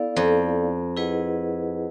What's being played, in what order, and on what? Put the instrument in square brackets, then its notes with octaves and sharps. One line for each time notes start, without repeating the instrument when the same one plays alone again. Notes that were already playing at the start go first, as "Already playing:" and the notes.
Already playing: [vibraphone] B3 E4 A4 D5 F5
[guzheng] F2
[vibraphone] E4 G#4 B4 D#5 F#5